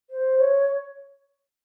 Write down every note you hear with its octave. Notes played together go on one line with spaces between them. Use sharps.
C5
C#5